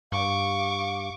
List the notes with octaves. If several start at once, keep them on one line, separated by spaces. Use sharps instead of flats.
G2 F5 C#6 D6